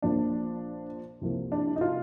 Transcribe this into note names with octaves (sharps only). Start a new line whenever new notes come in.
A#1 A#2 F3 A#3 D4
C2 C3 F3 A#3
D4
D#4
F4